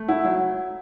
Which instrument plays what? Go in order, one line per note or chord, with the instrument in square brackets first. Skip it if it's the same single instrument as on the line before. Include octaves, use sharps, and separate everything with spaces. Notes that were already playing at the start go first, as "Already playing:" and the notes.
Already playing: [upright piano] A3
[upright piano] E4 [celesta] F#5
[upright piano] F#3 [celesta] F#5